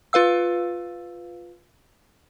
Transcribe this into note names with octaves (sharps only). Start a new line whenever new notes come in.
F4 B4 F5 E6